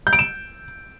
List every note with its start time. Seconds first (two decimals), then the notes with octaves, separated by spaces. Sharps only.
0.07 G6
0.13 D7
0.19 E7